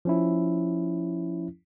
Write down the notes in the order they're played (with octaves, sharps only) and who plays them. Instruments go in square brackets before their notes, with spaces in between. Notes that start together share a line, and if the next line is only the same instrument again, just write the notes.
[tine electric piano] F3 C#4 E4